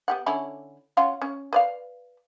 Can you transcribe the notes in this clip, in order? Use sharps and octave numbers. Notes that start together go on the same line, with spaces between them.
B3 G4 F#5
D3 C#4 E4
C#4 F4 F#4
C#4
B4 D5 F5